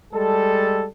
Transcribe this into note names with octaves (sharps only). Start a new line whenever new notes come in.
G3 G#3 A4